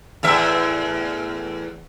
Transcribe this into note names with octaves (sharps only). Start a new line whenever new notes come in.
E2 A2 E5